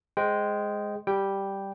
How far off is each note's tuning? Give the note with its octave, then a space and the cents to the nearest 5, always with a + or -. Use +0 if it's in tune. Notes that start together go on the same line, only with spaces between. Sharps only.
G#3 +0 C5 +0 G5 -10
G3 +0 G4 +0 G5 +0